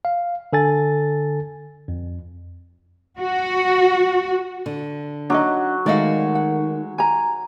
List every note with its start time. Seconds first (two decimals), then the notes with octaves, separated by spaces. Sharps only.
0.05 F5
0.53 D3 A4 G#5 A6
1.88 F2
3.19 F#4
4.66 D3
5.30 F#3 D4 D#4 D#5
5.86 D#3 G#3 A3 F#4 D5 D#5 F5
6.35 F#5
6.98 G#5 A#5